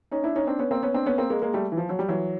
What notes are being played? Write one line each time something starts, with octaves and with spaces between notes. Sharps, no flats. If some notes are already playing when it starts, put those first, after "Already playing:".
C#4 D#4
D4 E4
C#4 D#4
C4 D4
B3 C#4
A#3 C4
B3 C#4
C4 D4
B3 C#4
A#3 C4
G#3 A#3
G#3 A#3
G3 A3
E3
F3
F#3
G3
E3 F#3